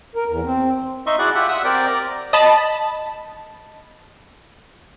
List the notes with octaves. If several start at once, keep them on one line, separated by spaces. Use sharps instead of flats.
A#4
E2
C4
D#4 D#5 E5 C6 C#6
E4 F#4 G#4 D5 F#5 F#6
F4 G4 E5 F#5
E5 F#5 D#6 E6
C4 G4 A#4 D5 G5
D5 A#5
D#5 A5 B5